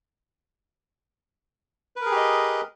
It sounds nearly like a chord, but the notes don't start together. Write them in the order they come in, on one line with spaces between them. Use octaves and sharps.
B4 A#4 G#4 G4 D#5